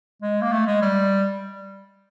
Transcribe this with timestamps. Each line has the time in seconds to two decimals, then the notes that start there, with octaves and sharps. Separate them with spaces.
0.22 G#3
0.42 A#3
0.52 A3
0.67 G#3
0.82 G3